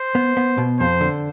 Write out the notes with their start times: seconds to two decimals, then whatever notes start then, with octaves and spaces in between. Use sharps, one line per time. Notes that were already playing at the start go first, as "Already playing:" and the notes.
Already playing: C5
0.15 B3
0.37 B3
0.58 B2
0.80 F2 C5
1.01 D3